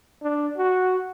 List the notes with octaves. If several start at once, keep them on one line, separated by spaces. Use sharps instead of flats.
D4
F#4